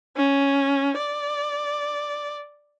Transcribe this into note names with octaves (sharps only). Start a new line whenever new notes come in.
C#4
D5